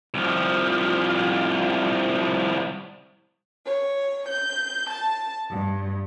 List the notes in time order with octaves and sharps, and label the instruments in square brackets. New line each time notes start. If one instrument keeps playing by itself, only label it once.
[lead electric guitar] C2 F3
[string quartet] C#5
G6
A5
G2